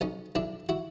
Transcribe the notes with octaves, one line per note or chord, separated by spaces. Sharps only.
B1 C#4 D#4
B1 D4 E4
E4 F#4